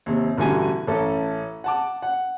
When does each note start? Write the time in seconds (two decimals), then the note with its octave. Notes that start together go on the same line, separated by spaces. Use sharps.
0.06 D#2 C3
0.38 A1 B2 D3 G3 G#5
0.87 A1 C#4 A4
1.64 F#5 A5 D6
2.02 F#5